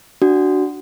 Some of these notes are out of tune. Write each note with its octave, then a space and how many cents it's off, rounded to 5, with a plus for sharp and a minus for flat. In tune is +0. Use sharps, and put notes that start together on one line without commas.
D4 +0 F#4 +5